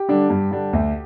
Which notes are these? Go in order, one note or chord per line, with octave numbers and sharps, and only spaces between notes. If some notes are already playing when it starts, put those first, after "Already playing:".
Already playing: G4
D3 G3 D4
G2
D3 G3 D4
D2